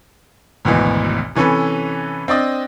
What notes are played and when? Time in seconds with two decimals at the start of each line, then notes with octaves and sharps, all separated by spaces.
0.65 G#1 D2 B2 E3
1.35 C3 E3 C#4 A4 B4
2.28 C4 D4 D5 D#5